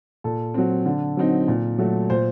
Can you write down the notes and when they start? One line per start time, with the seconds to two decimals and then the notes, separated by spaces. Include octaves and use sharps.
0.24 A#2 A4
0.54 F#3 C4
0.85 D3
1.17 F#3 C4 D#4
1.48 A#2
1.78 F#3 A3
2.10 A#2 C5